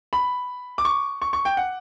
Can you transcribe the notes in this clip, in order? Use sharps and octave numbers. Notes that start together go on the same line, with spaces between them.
B5
D6
C#6
C#6
C#6
G5
F#5